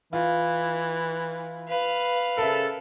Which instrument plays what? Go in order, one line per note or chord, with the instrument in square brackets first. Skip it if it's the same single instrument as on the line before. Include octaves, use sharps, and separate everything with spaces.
[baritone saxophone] E3 [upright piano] F4
[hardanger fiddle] B4 F5
[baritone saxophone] C#3 [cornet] A4 [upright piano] A#4 E5